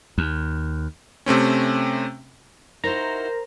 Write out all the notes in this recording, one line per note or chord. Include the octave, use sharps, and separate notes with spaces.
D#2
C3 A3 C4 C#4
D#4 E4 F#4 A#4 C5 A#5